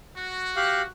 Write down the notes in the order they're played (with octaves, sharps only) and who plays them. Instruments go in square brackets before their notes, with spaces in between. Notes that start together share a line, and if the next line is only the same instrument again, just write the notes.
[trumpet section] F#4
[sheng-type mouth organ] G4 F5 F#6